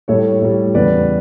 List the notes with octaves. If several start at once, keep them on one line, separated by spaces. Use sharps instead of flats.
A2 G3 A4 C#5
A2 G3
E2 C#3 G3 B4 D5